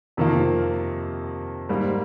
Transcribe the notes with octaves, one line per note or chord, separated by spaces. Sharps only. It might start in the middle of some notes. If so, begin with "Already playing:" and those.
F2 C3 D#3 A#3 F4
G#2 G3 A#3